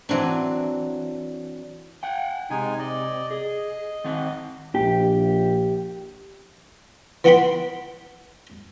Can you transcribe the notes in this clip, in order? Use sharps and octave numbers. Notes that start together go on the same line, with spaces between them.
E3 F#3 C4 D4
F#5 G5
C3 G#3 D#4 G#5
D5 D#5
G#4 D#5
D#3 C4 F#5
A#1 G4
E3 B3 F#5 G5 B5 C6